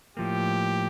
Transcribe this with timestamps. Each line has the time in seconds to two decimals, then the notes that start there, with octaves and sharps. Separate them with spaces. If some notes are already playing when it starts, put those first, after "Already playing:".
0.17 A2 F3 A#3 G4